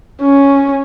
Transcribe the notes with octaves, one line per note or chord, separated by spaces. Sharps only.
C#4